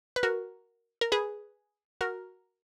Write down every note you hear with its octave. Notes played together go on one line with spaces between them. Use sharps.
B4
F#4 A#4
A#4
G#4 B4
F#4 A#4